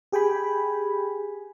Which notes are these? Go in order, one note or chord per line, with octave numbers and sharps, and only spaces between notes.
G4 G#4 G5 G#5 B5